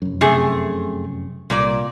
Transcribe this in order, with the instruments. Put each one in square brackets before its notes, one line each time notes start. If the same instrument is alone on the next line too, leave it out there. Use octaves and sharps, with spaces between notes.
[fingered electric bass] F1 F#2
[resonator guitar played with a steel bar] C3 A3 G#4
[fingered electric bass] C2 [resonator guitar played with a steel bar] A#2 A#3 D5